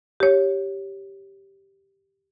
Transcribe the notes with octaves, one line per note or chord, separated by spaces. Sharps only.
G4 C#5